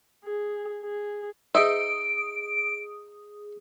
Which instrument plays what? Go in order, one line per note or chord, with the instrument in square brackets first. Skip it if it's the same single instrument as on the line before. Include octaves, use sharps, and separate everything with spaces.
[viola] G#4
G#4
[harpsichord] D#4 D#5 G5 [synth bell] G#4 D#6 [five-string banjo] E5 [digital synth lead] D7